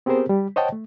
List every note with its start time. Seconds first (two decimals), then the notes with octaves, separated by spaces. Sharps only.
0.06 B3 C4 G4 G#4 A#4 C5
0.29 G3
0.56 C5 C#5 D#5 F#5 G5 A5
0.72 A3